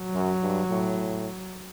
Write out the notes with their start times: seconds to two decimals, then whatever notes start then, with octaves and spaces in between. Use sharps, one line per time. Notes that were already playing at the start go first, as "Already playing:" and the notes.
Already playing: F#3
0.14 F#2
0.42 G2
0.70 A2